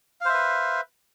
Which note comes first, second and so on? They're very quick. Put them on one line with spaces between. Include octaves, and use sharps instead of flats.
F5 C5 E5 B4